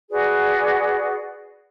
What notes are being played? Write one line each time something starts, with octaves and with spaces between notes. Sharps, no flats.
F#4 G#4 B4 D5